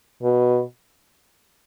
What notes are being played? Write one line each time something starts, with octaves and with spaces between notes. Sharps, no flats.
B2